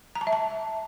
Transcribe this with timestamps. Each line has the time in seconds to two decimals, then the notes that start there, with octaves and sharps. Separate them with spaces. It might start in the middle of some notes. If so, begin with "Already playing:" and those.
0.15 A#5
0.21 A5
0.27 E5
0.33 A5